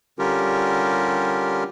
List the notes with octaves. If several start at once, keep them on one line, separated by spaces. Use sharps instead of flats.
D3 G3 C#4 F4 G4 A#4